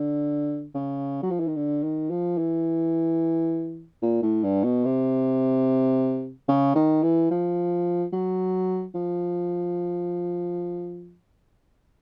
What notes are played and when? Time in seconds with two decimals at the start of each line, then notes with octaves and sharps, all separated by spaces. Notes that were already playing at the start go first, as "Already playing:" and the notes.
Already playing: D3
0.74 C#3
1.23 F#3
1.30 F3
1.39 E3
1.47 D#3
1.56 D3
1.83 D#3
2.10 F3
2.38 E3
4.02 A#2
4.22 A2
4.44 G2
4.64 B2
4.85 C3
6.48 C#3
6.75 D#3
7.03 E3
7.31 F3
8.13 F#3
8.95 F3